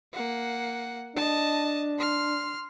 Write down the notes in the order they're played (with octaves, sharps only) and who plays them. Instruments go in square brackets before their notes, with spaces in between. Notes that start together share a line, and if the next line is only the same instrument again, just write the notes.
[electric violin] A#3 F#5
[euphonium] D4 [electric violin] D#5 A5
[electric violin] C6 F6